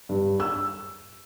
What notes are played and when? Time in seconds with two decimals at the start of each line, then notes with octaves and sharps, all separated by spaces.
0.09 G2
0.40 E6